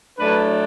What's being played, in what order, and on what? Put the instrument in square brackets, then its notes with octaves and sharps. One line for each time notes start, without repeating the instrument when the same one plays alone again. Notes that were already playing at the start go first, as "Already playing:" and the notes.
[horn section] A2 F#3 A3 D4 B4